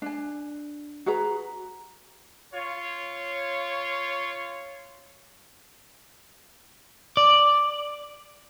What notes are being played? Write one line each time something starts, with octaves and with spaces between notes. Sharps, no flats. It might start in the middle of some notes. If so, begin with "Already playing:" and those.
D4 G#5
F#4 G#4 B4 A#5
F4 C#5
D5